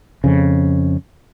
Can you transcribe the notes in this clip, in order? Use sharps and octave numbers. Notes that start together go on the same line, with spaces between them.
F2 C#3